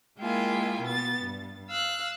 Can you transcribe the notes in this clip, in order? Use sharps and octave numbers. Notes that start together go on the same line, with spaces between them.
G#3 A#3 E4 F4 G5 G#5
B2 B3 A6
G2
F5 E6 F#6